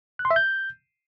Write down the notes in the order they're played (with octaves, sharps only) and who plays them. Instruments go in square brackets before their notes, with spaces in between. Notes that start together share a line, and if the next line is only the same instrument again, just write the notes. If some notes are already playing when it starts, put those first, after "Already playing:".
[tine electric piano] F#6
C6
E5
G6